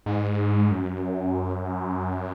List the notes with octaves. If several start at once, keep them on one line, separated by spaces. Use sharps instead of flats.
G#2
F#2